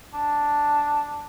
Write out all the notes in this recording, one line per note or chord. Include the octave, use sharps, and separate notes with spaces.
D4